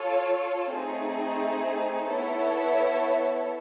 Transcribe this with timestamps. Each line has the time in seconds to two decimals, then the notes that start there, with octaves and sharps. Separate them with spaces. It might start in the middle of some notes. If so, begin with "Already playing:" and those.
Already playing: F4 A4 C#5
0.71 A3 C4 D#4 G#4
2.09 B3 E4 A4 C#5 E5